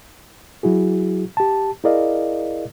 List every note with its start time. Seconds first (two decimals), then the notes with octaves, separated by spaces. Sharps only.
0.63 F#3 E4 F#4 G#4
1.37 G4 A5
1.84 E4 G#4 A#4 D5 D#5 F5